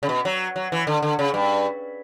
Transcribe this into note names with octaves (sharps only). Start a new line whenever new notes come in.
C#3
B2
F#3
F#3
E3
D3
D3
C#3
G2